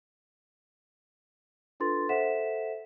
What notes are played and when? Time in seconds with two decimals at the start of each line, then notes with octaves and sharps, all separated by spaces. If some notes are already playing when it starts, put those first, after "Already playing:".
1.80 D4 F4 A4 B4 C6 A6
2.09 A4 C5 E5 F#5 B6 E7